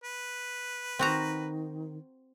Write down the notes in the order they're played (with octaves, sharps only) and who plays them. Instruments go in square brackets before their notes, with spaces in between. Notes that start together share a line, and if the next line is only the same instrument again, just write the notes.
[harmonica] B4
[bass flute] D#3 [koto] C4 F#4 A#5